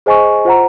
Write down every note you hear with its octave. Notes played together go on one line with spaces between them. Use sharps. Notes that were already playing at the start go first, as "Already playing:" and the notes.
G#4 C5 D#5 G#5 C#6
F4 C5 F#5 A#5